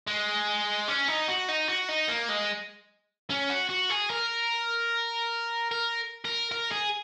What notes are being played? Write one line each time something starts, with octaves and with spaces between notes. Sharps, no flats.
G#3
C#4
D#4
F#4
D#4
F#4
D#4
A#3
G#3
C#4
F#4
F#4
G#4
A#4
A#4
A#4
A#4
G#4